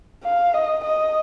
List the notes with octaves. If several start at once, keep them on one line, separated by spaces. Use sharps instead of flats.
F5
D#5
D#5